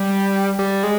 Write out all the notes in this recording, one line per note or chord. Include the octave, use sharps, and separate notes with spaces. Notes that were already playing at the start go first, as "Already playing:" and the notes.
Already playing: G3
G3
G#3